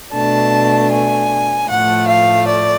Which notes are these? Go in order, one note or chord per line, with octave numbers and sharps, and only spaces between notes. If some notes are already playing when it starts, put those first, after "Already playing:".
B2 A3 D4 A5
G#5
A2 F3 A3 F#5
F5
D5